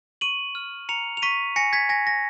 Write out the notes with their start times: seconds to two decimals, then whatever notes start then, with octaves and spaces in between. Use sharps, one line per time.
0.21 C#6 D#7 F#7
0.55 F6
0.89 A#5 C#7 F7
1.17 F7
1.22 C#6 B6 D#7
1.56 G#5 A#6 C#7
1.73 G#6 B6
1.89 G#5 A#6
2.07 A#6